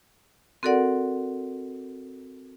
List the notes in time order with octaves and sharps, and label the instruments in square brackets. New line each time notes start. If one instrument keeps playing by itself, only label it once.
[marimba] C4 F#4 A4 A#4 D5 F#5